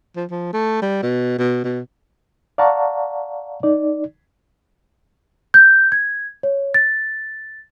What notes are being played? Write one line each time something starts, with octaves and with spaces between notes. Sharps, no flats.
F3
F3
A3
G3
B2
B2
B2
D5 F5 F#5 A5 A#5 C#6
D#4 D5
G6
G#6
C#5
A6